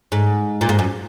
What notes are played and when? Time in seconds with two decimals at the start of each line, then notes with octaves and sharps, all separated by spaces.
0.12 G#2
0.61 A#2
0.69 G#2
0.79 F#2